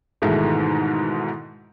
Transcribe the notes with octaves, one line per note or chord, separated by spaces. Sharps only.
G#2 B2 D#3 E3 G#3 A3